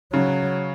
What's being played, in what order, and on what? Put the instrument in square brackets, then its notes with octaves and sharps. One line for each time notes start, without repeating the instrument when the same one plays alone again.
[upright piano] C#3 [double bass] F#3